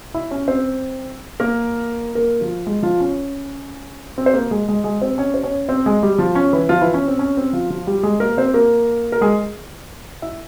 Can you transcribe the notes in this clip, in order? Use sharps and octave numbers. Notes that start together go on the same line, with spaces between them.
E4 E5
C#4 C#5
C4 C5
A#3 A#4
A#3 A#4
F3 F4
G#3 G#4
F3 F4
C#4
C4
C5
A#3 A#4
G#3 G#4
G#3 G#4
G#3 G#4
C4 C5
C#4 C#5
C5
C#4 C#5
C4 C5
G#3 G#4
G3 G4
F3 F4
C#4
E3 E4
F3 F4
E3 E4
C#4
C4
C#4
C4
F3 F4
F3 F4
G3 G4
G#3 G#4
A#3 A#4
C4 C5
A#3 A#4
A#4
G#3 G#4
E4 E5